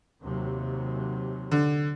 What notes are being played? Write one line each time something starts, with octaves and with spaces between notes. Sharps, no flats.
D#2 C3 F#3
D3